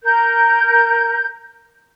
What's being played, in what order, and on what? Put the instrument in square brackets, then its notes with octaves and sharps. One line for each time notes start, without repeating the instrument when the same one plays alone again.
[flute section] A#4 G6